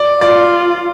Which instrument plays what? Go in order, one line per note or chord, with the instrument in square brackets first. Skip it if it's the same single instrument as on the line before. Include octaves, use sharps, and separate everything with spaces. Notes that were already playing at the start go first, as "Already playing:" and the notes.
Already playing: [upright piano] D5
[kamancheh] F4 [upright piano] D5